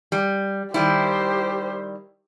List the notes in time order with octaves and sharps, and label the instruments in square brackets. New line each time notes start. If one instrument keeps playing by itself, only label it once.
[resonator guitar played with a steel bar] G3
[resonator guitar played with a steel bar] D#3 G3 E4 [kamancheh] G4 C5